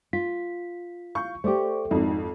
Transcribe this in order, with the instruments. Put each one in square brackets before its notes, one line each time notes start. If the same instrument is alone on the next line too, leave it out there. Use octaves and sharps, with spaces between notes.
[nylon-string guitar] F4 [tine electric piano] B6
[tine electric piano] F5 G6 [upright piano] C#6
[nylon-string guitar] A3 G4 [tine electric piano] C5 D5 D6
[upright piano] G#1 F2 [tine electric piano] D#4